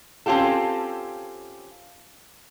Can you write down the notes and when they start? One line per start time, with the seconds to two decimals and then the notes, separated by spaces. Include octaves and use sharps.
0.26 C4 C#4 F4 G4 A4